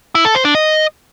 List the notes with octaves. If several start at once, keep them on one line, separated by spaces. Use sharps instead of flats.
E4
A4
C5
D4
D#5